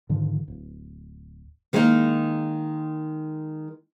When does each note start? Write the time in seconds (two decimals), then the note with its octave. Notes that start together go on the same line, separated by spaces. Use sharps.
0.09 G#2 D3 D#3 F3
0.48 D1
1.73 D#3 G#3 A#3 C#4 D#4